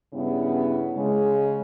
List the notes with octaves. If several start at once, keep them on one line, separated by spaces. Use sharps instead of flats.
G2 C#3 B3 E4
C#3 G#3